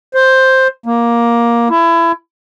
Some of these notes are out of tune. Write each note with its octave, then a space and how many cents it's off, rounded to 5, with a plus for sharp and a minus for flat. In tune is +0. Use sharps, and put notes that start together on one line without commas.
C5 +5
A#3 +10
E4 +25